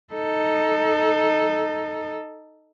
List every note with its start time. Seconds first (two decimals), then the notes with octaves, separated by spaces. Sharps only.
0.14 D#4 A4